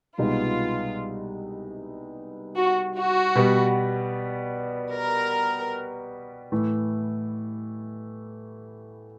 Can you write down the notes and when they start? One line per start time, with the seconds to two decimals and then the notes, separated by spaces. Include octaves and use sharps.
0.18 C2 B2 G#3 B3 D#4 F4
2.56 F#4
2.95 F#4
3.35 B2 G3 B3
4.93 A#4
6.52 A2 E3 A3